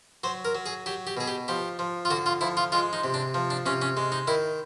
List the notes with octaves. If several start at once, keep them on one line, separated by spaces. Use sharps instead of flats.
F#3 C5
A#4
F#3
G#4
F#3 G4
G4
B2 G#4
G4
F3 G4
F3
F4
D3 F#4
F4
F3 E4
F4
G#3 F4
D#4
C3
D4
F3
D4
C3 C#4
C#4
G#3
D#4
D#3 E4